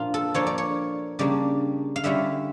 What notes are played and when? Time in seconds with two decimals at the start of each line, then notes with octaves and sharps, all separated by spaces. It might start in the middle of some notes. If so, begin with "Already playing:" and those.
Already playing: A#2 F3 A#3 D4 F4
0.14 A4
0.34 F3 A#3 D4 F4 C#5
0.47 D5
0.58 C#5
1.19 C#3 G3 A#3 D4 D5
1.96 F5
2.04 D3 G3 C#4 E4 E5